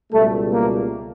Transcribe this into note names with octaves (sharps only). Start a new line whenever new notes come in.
C#2 B2 G3 A3
A#3